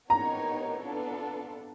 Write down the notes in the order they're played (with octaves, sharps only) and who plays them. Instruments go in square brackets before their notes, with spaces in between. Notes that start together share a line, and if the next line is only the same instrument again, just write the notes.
[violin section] B3 D#4 G4 A#4 C#5 [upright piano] A#5
[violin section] B3 D4 F4 A4